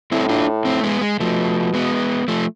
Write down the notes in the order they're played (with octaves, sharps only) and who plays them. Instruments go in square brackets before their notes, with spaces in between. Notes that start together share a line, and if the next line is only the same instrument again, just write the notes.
[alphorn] A2 [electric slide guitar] C4 E4
[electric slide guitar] D4 F4
A3 C4
G#3 B3
G#3
[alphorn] B2 [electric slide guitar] F3 A3
[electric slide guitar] G#3 B3
F3 A3